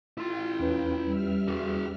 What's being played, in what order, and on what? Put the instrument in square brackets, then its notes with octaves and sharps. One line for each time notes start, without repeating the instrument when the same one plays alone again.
[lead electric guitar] E4 C6 [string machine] F4 G5
[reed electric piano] E2 C#4 B4
[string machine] G3 E5 F6
[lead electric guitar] F#4 G#4